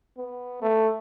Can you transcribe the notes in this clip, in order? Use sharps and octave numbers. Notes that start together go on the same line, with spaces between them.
B3
A3